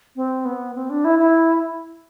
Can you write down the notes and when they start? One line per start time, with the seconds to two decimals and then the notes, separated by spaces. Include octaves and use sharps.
0.16 C4
0.45 B3
0.75 C4
0.90 D4
1.05 E4
1.19 E4